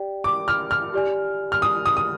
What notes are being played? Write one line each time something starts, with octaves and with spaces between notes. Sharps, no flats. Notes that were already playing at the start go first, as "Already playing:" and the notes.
Already playing: G4 D5 G5
D6
F6
F6
G4 D5 G#5
F6
D#6
D#6
D#6